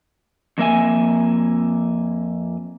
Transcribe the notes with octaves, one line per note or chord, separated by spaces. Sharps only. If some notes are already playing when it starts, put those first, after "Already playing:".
F2 A#3 E5 G#5